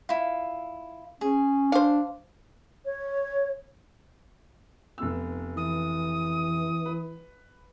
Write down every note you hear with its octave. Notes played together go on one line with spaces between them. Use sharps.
E4 F4
C#4 G#4
D4 C5 F5
C#5
F1 B3 E6
E3 D#6
B4